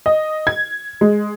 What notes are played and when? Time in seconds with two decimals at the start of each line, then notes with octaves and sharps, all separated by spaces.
0.06 D#5
0.47 G#6
1.01 G#3